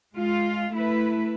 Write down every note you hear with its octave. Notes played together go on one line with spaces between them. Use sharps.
G#3 F4
A3 E4 B4